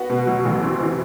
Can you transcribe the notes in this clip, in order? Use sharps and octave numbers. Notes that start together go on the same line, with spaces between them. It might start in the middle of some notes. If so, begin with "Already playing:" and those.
Already playing: B3 F#4
B2
F#3
A1
C4
E3